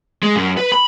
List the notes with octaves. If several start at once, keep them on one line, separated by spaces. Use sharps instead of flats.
G#3
F#2
B4
B5